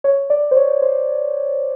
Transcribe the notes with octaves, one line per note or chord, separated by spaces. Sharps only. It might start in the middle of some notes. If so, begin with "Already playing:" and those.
C#5
D5
C5
C#5
C5